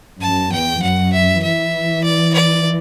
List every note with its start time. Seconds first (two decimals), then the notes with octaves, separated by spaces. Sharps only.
0.21 F#2 A5
0.52 E2 G5
0.82 F#2 F#5
1.13 E5
1.43 E3 E5
2.04 D5
2.34 D5